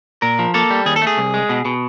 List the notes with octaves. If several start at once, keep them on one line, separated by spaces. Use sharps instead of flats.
A#2 A#4
F3
A#3 A4
G3
D#2 G#4
A4
A3
G#4
C2
G#3
B2
B2